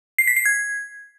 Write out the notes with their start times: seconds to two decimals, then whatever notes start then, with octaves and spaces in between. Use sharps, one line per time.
0.18 C7
0.27 B6
0.36 C7
0.45 G#6